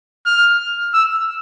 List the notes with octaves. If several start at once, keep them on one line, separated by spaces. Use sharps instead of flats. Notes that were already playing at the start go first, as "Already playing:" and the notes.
F6
E6